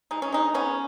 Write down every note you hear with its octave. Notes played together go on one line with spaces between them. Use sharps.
G#3 D#4
C#4
G#3 D#4
B3 C#4